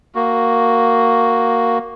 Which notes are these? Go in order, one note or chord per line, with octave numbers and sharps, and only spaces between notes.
A#3 F#4